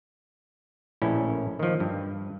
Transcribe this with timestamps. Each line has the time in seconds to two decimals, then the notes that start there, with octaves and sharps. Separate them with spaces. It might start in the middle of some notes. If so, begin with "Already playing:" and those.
1.02 A#1 A2 C#4 E4
1.59 D#3 F3
1.80 G2